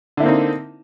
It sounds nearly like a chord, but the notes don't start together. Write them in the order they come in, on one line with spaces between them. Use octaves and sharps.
D3 E4 A#3 C4 D#4